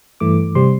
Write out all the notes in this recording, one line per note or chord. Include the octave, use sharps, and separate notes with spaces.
G2 E3 A3 D6
C3 G3 C4 C6